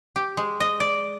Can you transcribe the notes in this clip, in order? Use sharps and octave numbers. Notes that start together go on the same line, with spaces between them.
G4
G#3
D#5
D5